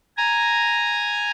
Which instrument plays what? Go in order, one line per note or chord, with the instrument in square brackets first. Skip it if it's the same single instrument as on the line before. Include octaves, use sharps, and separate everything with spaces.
[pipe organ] G#5 A#5